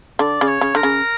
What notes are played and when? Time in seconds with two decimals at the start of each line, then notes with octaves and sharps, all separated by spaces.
0.19 D3 D5
0.41 C#3
0.48 C#5
0.61 C#3
0.75 D3 A#4
0.83 C#3